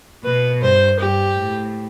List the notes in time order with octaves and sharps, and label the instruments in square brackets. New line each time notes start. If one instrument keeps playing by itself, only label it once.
[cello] B2 [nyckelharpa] B4
[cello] G2 [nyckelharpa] C5
[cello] G2 [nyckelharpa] G4
[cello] A2